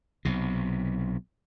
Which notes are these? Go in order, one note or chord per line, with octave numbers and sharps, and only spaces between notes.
B1 C3